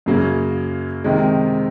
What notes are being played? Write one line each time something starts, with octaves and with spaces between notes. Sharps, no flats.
F#2 C#3 F#3 A#3
C3 D#3 G#3